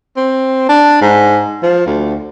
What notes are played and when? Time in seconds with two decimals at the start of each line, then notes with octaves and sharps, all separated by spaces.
0.17 C4
0.69 D4
1.01 G#2
1.63 F3
1.86 D2